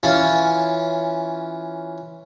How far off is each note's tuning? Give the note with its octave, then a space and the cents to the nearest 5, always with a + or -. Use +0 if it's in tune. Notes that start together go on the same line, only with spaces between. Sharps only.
E3 +0 C#4 +0 F4 +0